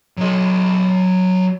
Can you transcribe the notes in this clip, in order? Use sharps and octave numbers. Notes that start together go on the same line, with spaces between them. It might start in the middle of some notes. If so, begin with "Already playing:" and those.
F#3 D#5